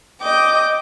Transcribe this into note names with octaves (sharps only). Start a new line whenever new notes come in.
D#5 G5 D6